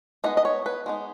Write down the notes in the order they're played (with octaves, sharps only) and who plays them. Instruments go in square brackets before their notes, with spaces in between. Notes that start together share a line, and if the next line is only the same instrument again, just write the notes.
[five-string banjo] G#3 B3 D#4 D#5
D#5
C#5
B4
G#3 B3 D#4